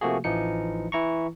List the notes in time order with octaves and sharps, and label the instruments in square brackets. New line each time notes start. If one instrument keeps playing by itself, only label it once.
[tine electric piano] C3 F3 A3 A#3 F#4 G#4
A1 E3 F3 D#4 C#7
E3 E4 A#5 C#6